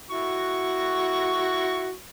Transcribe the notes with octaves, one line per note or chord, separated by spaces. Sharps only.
E4 F#4 C#6